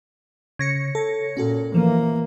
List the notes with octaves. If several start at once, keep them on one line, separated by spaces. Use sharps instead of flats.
C#3 C#5 A#6 C#7
A4
A#2 C#4 F#4 A4
E3 F3 A#3